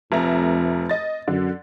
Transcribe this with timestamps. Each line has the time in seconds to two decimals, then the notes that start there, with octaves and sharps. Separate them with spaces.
0.12 F1 F2 E5 A#5
0.89 D#5 A6
1.28 F#2 D3